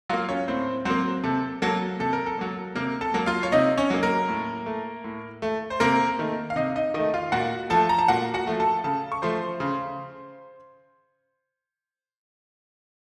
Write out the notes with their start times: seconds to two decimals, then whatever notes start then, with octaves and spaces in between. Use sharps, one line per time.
0.09 F#3 A#3 F4 F5
0.29 C#4 C#5
0.48 A2 C4 C5
0.85 F#3 A#3 C4 C5
1.24 C3 A4
1.62 F#3 A#3 A4
2.00 C3 A4
2.13 A#4
2.26 A4
2.38 F#3 A#3
2.75 C3 A#3 A#4
3.01 A4 A5
3.14 F#3 A#3
3.26 F4 F5
3.43 C#5
3.52 C3 D#4 D#5
3.77 C#4 C#5
3.90 F#3 A#3
4.03 A#3 A#4
4.28 A2
4.66 A3
5.04 A2
5.42 A3
5.70 C5
5.80 C3 A#3 A#4
6.19 D#3 A3
6.50 F5
6.56 C3 D#4 D#5
6.76 D#4 D#5
6.94 D#3 A3 D#4 D#5
7.14 F4 F5
7.32 A#2 F#4 F#5
7.70 F3 A3 A4 A5
7.89 A#5
7.99 A5
8.08 A#2 F#4 F#5
8.34 F#4 F#5
8.47 F3 A3
8.60 A4 A5
8.84 C#3 A4 A5
9.12 C#6
9.22 F3 A3 C5 C6
9.60 C#3